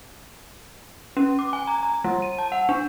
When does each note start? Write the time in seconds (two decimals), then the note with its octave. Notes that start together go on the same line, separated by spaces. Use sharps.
1.17 C#4
1.39 D6
1.53 G#5
1.67 A#5
1.83 A#5
2.04 G3
2.22 D#7
2.38 A5
2.52 F#5
2.69 D4